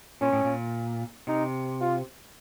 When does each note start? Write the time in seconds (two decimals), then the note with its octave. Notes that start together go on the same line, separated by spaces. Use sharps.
0.21 A#2 C#4
0.33 A2
0.44 A#2
1.27 C3 D#4
1.81 F4